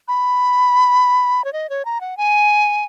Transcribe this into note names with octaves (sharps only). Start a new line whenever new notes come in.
B5
C#5
D#5
C#5
A#5
F#5
G#5